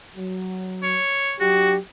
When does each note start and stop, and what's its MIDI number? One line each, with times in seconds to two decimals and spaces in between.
0.17 0.96 54
0.82 1.34 73
1.40 1.77 54
1.40 1.77 62
1.40 1.73 66
1.40 1.77 67